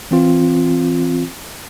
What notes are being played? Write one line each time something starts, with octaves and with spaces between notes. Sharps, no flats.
E3 C4 F4